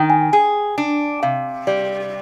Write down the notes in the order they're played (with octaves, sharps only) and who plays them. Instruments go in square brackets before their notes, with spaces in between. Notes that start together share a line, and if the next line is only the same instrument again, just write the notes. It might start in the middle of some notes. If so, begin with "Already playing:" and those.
Already playing: [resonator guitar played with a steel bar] D#3 [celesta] G5
[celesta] G#5
[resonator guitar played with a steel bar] G#4 [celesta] G#5
[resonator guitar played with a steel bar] D4
[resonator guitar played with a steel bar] C3 [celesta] F5
[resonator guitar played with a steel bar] G3 [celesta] D5